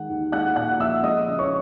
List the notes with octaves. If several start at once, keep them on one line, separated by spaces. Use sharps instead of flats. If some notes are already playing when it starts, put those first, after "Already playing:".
Already playing: D#3 G#3 F#5
D#2
G#3 F#5 F#6
A#2 F#5 F#6
A#1 E5 E6
G#3 D#5 D#6
C#3
C#5 C#6